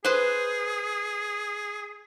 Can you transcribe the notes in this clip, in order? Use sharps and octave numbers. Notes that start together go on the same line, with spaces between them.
G#4 B4 C5